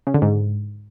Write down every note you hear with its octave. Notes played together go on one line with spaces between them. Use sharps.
C#3
D3
G#2